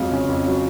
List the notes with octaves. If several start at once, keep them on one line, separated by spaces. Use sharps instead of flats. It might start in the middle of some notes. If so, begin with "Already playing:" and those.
Already playing: F2 F#3 G#3 F5
C#3
F2
F#3